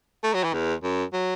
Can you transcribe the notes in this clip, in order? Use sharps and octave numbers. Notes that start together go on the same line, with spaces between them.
A3
F#3
E3
E2
F#2
F#3